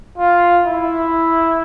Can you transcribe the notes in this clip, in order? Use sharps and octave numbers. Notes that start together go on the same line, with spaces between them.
F4
E4